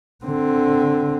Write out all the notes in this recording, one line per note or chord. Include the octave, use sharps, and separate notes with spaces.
D3 C4